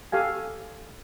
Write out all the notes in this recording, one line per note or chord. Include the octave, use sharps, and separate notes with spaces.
G4 A4 F5 G#5